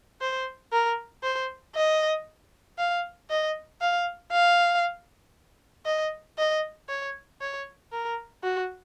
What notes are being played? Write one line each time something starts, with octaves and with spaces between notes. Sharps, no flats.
C5
A#4
C5
D#5
F5
D#5
F5
F5
D#5
D#5
C#5
C#5
A#4
F#4